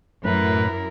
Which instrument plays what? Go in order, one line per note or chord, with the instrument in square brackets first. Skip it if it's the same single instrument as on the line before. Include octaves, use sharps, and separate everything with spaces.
[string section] F#2 [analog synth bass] A2 [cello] E4 A#4 [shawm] B4